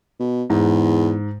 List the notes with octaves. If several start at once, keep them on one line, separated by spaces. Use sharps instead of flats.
B2
E2 G#2